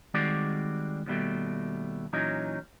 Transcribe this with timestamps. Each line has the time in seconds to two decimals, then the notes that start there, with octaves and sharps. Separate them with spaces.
0.14 D#3 G3 G#3 C4 F#4 D5
1.06 D#2 B2 G3 A3
2.13 A#2 E3 F#3 C#4 D#4